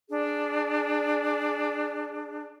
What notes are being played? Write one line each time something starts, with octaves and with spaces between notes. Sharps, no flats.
D4 G#4